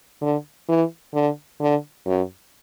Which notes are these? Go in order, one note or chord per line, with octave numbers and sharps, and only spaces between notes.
D3
E3
D3
D3
F#2